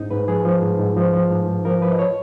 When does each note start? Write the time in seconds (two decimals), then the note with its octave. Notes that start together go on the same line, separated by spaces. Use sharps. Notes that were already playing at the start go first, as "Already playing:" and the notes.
Already playing: G#2 D#4
0.11 G#2 B4
0.27 F3 G#4
0.45 F3
0.62 G#2
0.79 G#2
0.96 F3
1.13 F3
1.30 G#2
1.47 G#2
1.65 F3 A#4
1.82 F3 B4
1.92 D#5
1.99 C#5